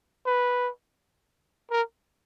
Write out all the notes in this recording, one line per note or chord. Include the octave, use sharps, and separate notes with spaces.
B4
A#4